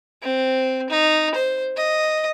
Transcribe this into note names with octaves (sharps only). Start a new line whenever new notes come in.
C4
D#4
C5
D#5